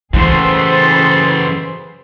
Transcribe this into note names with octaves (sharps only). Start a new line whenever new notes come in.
F#2 A2 C#3 E3 G#4 A4 B4 C5